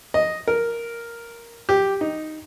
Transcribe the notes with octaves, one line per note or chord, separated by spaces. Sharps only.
D#5
A#4
G4
D#4